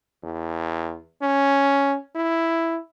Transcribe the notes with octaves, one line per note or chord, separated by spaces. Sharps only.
E2
C#4
E4